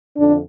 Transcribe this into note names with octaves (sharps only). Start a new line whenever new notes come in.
F2 D3 D4